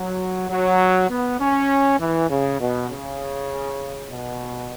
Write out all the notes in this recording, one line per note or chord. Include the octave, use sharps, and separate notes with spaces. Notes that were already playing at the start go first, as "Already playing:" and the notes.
Already playing: F#3
F#3
B3
C#4
E3
C#3
B2
C#3
B2